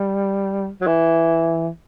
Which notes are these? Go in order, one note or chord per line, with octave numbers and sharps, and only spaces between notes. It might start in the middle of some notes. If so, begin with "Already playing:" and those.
Already playing: G3
F#3
E3